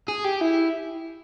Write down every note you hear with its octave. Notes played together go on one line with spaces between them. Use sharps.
G#4
G4
E4